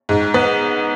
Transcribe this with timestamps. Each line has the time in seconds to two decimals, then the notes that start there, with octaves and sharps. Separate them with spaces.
0.09 G#2
0.34 B3